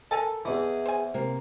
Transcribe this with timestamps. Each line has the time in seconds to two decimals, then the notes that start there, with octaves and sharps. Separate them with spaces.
0.11 A4 A#4 G#5 A5
0.45 E2 E3 G#4 D#5
0.86 C5 G#5
1.14 C3 A#3